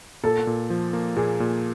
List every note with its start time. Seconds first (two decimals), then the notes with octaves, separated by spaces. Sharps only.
0.24 A#2 A4
0.47 A#2
0.70 F3
0.93 A#3
1.16 A#2 G#4
1.40 A#2